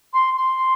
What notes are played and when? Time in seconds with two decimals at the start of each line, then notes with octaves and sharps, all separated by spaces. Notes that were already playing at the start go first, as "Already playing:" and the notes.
0.14 C6
0.37 C6